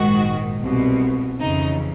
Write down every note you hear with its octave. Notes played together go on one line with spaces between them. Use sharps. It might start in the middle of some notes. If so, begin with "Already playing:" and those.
Already playing: A#1 G#2 D#3 F#4
C2 B2
F2 C#3 E3 D#4